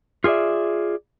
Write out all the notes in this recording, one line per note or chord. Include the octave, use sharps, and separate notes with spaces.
F4 G#4 A4 D5 E5